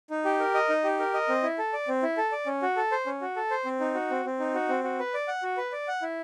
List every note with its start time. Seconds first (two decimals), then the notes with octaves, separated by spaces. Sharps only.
0.10 D#4
0.25 G4
0.40 A#4
0.54 D#5
0.69 D#4
0.84 G4
0.99 A#4
1.14 D#5
1.29 C4
1.43 E4
1.58 A4
1.73 D5
1.88 C4
2.03 E4
2.17 A4
2.32 D5
2.46 C#4
2.62 F#4
2.76 A4
2.92 C5
3.06 C#4
3.21 F#4
3.36 A4
3.51 C5
3.65 C4
3.80 D#4
3.95 F#4
4.10 C4
4.25 C4
4.39 D#4
4.54 F#4
4.69 C4
4.84 F#4
4.99 B4
5.14 D5
5.28 F#5
5.43 F#4
5.57 B4
5.72 D5
5.88 F#5
6.02 E4